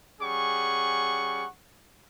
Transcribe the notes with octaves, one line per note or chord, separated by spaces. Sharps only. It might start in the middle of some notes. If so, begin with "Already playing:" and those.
G3 C#4 G#4 F#5 C#6